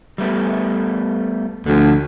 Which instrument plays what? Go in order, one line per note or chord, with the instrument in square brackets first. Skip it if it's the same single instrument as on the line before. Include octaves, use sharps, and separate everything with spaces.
[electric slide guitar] G3 A3 B3
[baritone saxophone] D2 [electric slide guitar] D3 F3